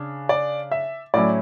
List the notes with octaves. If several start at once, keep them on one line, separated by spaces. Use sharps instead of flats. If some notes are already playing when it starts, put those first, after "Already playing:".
Already playing: C#3 D4
D5
E5
A2 F#3 C#4 E4 D5